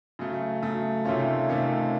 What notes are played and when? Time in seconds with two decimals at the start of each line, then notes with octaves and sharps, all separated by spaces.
0.19 C#3 F#3 A3
0.62 C#3 F#3 A3
1.05 C3 D#3 A3 C#4 F4
1.48 C3 D#3 A3 C#4 F4